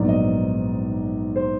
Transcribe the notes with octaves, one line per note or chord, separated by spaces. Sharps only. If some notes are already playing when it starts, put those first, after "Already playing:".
Already playing: A#1 G#2 D#3 F#3 B3 D5
D#5
C5